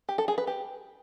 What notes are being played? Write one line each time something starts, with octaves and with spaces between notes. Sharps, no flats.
G4
A4
G#4
B4
G4